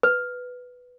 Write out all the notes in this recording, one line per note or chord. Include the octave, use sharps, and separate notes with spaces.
B4